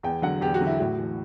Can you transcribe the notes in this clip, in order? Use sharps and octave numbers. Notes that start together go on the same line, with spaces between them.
E2 G5
D3 F#3 F#5
E2 G4
F#4
D3 F#3
E4
A2 F#4
E3